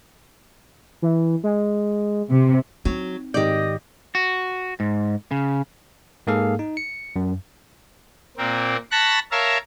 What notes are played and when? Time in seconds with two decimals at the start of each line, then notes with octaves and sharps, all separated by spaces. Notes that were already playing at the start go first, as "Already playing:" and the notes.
1.02 E3
1.44 G#3
2.30 C3
2.85 F#3 C4 D#4
3.34 G#2 D#3 G4 D5 D#5 G6
4.15 F#4
4.80 G#2
5.31 C#3
6.27 G#2 A#3 G#4 A4 F5
6.59 D#4
6.77 C#7
7.16 F#2
8.37 A#2 A#3 C4
8.91 A5 B5 C#6 F#6 A6 A#6
9.31 A#4 C#5 E5 F5 A5 A#5